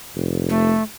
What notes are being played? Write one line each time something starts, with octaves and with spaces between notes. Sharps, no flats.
F1
A3